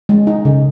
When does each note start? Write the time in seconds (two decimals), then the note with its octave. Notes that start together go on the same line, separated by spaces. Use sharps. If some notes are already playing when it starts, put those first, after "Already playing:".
0.09 G#3
0.27 D#4
0.45 C#3